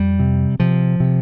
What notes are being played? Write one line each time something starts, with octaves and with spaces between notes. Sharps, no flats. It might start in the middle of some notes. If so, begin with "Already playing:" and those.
Already playing: F2 G3
C3
C3 F3
C3